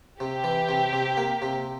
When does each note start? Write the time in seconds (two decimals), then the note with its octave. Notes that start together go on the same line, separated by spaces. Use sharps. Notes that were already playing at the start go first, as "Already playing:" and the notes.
0.20 C3 G4
0.44 E3
0.69 C3
0.93 C3
1.17 A#3
1.42 C3